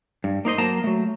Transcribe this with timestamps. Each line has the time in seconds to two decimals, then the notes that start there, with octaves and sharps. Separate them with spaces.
0.24 G2
0.45 A#3 D#4 C5 D#5
0.58 F#3 A#3 A5 A#5
0.84 F#3 A3